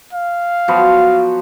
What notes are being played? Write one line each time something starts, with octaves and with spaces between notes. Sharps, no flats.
F5
F3 F#3 B3